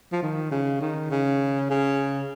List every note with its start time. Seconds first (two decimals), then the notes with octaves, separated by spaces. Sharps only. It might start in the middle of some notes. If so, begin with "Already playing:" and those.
0.12 F3
0.22 D#3
0.51 C#3
0.81 D#3
1.11 C#3
1.70 C#3